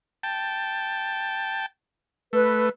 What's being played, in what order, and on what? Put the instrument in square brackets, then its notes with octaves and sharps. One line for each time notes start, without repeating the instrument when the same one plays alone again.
[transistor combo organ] G5 A5
[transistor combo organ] A3 [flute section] B4